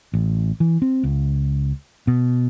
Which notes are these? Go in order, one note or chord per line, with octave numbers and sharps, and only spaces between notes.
A1
E3
C4
C#2
B2